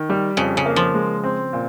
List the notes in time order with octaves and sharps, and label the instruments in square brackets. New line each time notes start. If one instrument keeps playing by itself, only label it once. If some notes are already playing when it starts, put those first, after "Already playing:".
Already playing: [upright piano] D#3
G3
[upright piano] F2 [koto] C#3
[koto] C#3
[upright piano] A#3
[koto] F3
[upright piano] G#3
C4
A#2